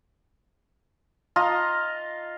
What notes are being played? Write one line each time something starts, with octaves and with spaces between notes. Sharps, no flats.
F4 D#5 A#5